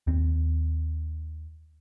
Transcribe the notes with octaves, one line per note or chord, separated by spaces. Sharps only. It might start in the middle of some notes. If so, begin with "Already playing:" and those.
D#2 C4